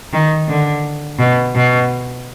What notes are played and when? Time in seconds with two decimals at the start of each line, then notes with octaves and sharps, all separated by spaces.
0.13 D#3
0.48 D3
1.19 B2
1.55 B2